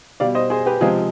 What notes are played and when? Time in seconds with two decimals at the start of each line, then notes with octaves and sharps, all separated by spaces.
0.20 B2 G3 D5 F5
0.35 C5 D#5
0.50 G#4 C5
0.66 G4 B4
0.81 C3 F3 G#3 F4 G#4